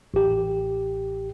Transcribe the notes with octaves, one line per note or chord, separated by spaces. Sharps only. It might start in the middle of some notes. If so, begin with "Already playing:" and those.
A1 G4